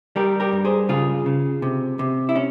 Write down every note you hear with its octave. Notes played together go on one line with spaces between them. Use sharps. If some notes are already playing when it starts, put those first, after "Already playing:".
G3 G4 A#4
G4 A#4
G2
G#4 C5
C#3 F4 G#4
C#3
C3
C3
E4
C#4